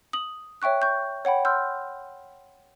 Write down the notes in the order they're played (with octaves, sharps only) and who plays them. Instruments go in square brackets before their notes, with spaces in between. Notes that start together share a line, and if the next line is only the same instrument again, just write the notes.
[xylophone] D#6 F#7
C#5 E5 G5 C#6 F#6
C#6 G6
C#5 F#5 G5 B5
C6 E6 F6 G6